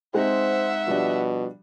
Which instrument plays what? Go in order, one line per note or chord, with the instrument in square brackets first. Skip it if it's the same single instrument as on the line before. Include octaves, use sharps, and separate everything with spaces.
[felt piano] G#3 C4 D#4 [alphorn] C5 [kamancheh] E5 F#5
[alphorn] B2 [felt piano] F3 G3 D4